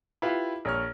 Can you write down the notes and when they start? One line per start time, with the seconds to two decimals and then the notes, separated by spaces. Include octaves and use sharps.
0.22 E4 F4 G4 B4 F5
0.65 A#1 C#5 F6